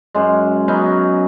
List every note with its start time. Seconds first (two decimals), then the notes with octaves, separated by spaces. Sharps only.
0.15 F#2 G#3
0.68 F#3 B3 C#4 D#4